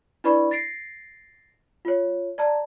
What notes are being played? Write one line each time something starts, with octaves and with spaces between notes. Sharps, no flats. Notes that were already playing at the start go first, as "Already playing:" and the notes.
D4 E4 B4 D5 B5 C#6
A6 A#6 C7 D7
F4 C#5
D5 A5 A#5